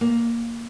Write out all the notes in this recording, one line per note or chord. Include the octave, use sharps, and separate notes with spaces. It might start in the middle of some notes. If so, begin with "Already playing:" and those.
A#3